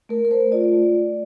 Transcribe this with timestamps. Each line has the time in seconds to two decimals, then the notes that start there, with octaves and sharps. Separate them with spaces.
0.09 A3 A#4
0.25 A#4
0.31 A3 C5
0.52 F4 D5
0.73 A3
0.94 A3